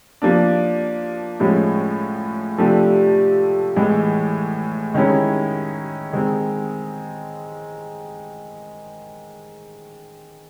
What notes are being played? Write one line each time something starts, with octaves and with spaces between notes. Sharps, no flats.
F3 A#3 D4
A2 F3 G#3 C#4
C3 F3 A3 D4 G4
A2 E3 G#3
D#3 G#3 C#4 E4
D#3 G#3 C4